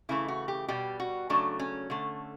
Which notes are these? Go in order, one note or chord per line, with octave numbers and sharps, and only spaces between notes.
C#3 E3 A3 E4
F#4
G4
B2 G3 G4
F#4
C#3 F#3 A3 D4
C#4
D3 A3